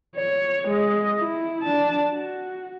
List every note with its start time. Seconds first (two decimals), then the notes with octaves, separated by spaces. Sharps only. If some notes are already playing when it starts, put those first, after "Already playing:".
0.16 C#5
0.68 G#3 D#5
1.19 E4
1.62 D4 A5
2.12 F#4